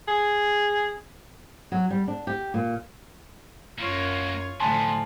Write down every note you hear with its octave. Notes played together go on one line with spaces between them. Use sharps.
G#4
F#3
G3
D4
G4
A#2
F#2 A#3 F4 F#4 C#5
A2 D3 F3 F#3 B3 G#5 A5 C6